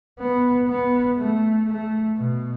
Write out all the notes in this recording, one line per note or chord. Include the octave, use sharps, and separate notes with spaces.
B3
B3
A3
A3
B2